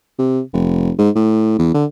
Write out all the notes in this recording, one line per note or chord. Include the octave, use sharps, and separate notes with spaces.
C3
F1
G#2
A2
E2
D3